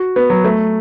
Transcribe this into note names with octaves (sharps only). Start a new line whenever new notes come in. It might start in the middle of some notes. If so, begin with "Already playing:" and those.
Already playing: F#4
B3
F#3
A3